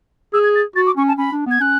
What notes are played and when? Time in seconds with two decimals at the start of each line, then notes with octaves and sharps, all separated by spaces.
0.33 G#4 E6
0.44 G#6
0.55 A6
0.76 F#4 A6
0.86 D6
0.97 C#4 C#6
1.08 A5
1.18 C#4 B5
1.32 D4
1.46 B3 G#6
1.60 C#4 F#6